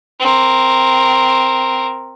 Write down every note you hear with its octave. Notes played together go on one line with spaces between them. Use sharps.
C4 A#4